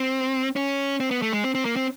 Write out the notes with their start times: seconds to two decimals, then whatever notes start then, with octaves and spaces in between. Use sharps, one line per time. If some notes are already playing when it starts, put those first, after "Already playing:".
Already playing: C4
0.56 C#4
1.00 C4
1.11 B3
1.22 A3
1.33 G#3
1.44 C4
1.55 C4
1.65 A#3
1.76 C4